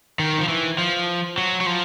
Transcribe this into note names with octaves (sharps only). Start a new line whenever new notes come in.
D#3
F3
E3
F3
F#3
F#3
F3